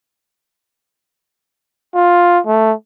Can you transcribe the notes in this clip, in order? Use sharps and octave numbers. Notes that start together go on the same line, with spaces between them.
F4
A3